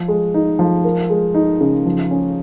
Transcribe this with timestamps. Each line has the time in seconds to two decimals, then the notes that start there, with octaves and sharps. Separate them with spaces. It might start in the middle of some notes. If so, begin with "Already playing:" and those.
Already playing: F3
0.08 G#3
0.34 D#4
0.59 F3
0.84 A#4
1.10 G#3
1.34 D#4
1.61 C#3
1.86 F3
2.11 C#4